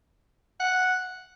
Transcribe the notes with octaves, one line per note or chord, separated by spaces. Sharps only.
F#5